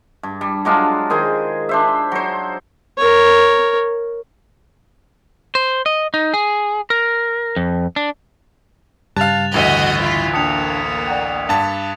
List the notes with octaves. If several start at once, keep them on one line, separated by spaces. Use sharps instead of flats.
G2
G3
F#3 G#3 D4 F4
D#3 G#4 C5 G#5
D4 C5 E5
F#3 C5
A#4 C#5
C5
D#5
D#4
G#4
A#4
F2
D4
G2 C#3 G3 F5 A5 F#6 A6 F7
A1 D2 F#4 D#5 G6 B6 F7
E4 F4
A#3 D4 G5 A5 D#6 C#7 F7
D5 F#5 G5
G2 A5